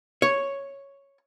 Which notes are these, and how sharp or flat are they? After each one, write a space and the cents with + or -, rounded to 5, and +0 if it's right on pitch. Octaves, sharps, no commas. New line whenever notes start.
C#5 +0